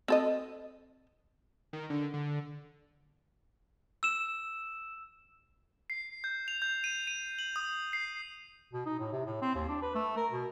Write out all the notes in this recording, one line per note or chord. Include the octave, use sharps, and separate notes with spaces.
C4 A4 D#5
D#3
D3
D3
E6 E7
C7
G6
F7
G6
D#7
D#7
F#7
D#6
C7
B2
D#4
A2
C3
A2
C4
D#2
D4
B4
A3
A#4
B2